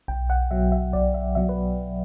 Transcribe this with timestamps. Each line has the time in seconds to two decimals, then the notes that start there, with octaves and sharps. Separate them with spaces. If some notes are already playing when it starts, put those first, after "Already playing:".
0.08 B1 G5
0.30 F#5
0.51 B2 F#3 E5
0.72 E5
0.93 B1 D5
1.14 E5
1.35 B2 F#3 E5
1.49 B4